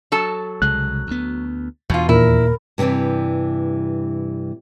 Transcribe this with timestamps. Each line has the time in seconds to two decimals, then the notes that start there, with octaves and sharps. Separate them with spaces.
0.12 F#3 A4 A5
0.62 C2 C#3 G#3 F#6
1.07 D2 B3
1.90 E2 B2 E3 F4
2.09 D#2 A#2 E4 A#4
2.78 G2 C3 D#3 E3 G3